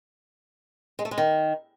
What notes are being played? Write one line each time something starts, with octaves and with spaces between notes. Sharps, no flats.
G#3
A3
G#3
D#3